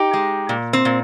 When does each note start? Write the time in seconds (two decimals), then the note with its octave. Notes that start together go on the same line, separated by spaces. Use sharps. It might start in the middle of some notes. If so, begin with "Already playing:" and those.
Already playing: D#4 G4
0.14 G#3
0.49 A#2
0.73 C4
0.85 A#2